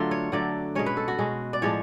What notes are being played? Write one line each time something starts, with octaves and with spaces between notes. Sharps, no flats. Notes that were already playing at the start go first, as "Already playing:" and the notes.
Already playing: D3 F#3 A3 F4
C#5
D3 F#3 A3 D5
B2 G#3 C#4 C#5
B4
A4
F#4
B2 G#3 C#4
D5
A2 F3 G#3 D4 C#5